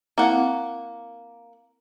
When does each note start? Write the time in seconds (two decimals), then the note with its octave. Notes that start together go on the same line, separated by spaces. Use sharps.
0.18 A#3 C4 E4 F#5